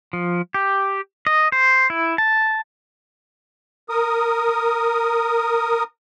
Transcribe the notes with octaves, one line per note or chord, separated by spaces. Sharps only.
F3
G4
D#5
C5
E4
A5
A#4 D#6